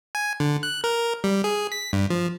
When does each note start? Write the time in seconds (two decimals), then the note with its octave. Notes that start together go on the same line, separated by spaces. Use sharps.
0.15 G#5
0.40 D3
0.63 F#6
0.84 A#4
1.24 G3
1.44 G#4
1.72 B6
1.93 G2
2.10 F3